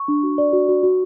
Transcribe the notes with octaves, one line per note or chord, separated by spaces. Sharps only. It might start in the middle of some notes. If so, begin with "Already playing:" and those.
Already playing: C#6
D4
F#4
D5
F#4
F#4
F#4